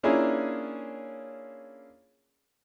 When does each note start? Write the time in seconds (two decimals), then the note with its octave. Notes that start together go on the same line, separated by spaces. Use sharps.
0.03 A#3 C#4 D4 E4 F4 G#4